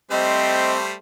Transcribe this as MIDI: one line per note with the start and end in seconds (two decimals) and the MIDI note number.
0.11 0.93 55
0.11 0.93 57
0.11 0.78 60
0.11 0.93 72
0.11 0.73 75